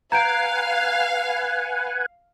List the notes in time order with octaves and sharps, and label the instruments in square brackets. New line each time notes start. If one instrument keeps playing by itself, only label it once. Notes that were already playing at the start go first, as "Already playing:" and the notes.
[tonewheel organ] B4 F#5 G#5 [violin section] F5 [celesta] A#5 G6 D7